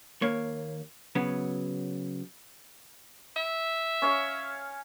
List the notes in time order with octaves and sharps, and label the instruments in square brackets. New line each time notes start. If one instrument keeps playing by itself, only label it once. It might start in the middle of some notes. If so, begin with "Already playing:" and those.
[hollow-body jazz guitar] D#2 A#3 C#5
C#3 F#3 B3
[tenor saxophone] E5
[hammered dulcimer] C#4 C#5 F5